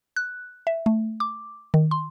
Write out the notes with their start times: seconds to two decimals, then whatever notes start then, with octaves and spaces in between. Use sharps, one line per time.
0.16 F#6
0.67 E5
0.86 A3
1.20 D6
1.74 D#3
1.91 C6